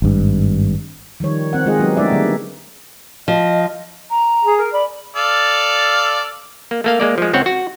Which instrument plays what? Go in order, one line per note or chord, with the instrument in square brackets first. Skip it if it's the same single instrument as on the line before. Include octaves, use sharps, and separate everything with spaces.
[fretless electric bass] G#1 G2
[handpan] D#3 F3 G3 C#5
C4 F#5
G#3 F4 G#4 D#5
F#3 G#3 B3 D#4 G4
A3 C#4 D#4 E4 D5 E5
D3 G3 A#3
[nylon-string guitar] F3 [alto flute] D#5
[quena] A#5
[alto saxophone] G#4
[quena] A#4
[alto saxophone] D5 [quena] B5
[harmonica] A4 D5 F5
[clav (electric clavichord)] A#3
A3 A#3 F5
G#3 A#3 D5
F3 G#3
C#2 C4 C#5 F#5
F#4